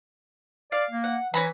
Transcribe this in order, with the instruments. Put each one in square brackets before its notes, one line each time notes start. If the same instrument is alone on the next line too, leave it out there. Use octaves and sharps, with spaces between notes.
[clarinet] D5 [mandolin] F5
[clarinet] A#3
[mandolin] F#5
[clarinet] E3 [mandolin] C#4 A#5 B5